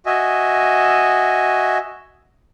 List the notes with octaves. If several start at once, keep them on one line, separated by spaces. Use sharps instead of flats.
F#4 D#5 E5 G#5